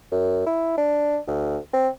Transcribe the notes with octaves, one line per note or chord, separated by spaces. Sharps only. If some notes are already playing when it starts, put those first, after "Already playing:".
F#2
E4
D4
D2
C4